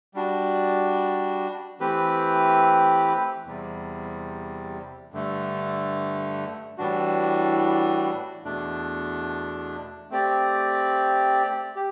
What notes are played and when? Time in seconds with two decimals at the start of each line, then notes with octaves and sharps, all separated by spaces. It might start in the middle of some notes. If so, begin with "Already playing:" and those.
0.14 G3 D4 F#4
1.80 E3 A3 C4 G4 B4
3.46 E2 C3 G3
5.12 G2 D3 A3
6.78 A2 E3 G3 D4 F#4
8.44 E2 B2 A3 D4
10.10 A3 C4 G4 D5
11.76 G4